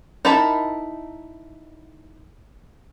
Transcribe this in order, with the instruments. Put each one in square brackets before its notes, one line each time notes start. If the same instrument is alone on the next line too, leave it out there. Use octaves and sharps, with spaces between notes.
[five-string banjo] D#4 E4 A#4 A5 B5